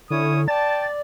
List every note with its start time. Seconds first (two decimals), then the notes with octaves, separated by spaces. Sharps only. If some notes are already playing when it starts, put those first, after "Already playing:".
0.10 D3 C#4 E4 C#5 D#6
0.48 D5 G5 A5 A6